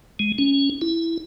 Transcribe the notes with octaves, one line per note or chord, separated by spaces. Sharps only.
G#3
C#4
E4